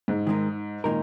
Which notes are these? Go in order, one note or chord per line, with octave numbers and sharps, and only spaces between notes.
G#2
D#3 G#3 D#4 A#4
A#2 D#3 G#3 D#4 A#4